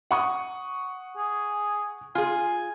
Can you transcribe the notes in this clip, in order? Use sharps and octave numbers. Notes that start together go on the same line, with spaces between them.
F#5 C#6 D#6
G#4
F4 G#4 G#5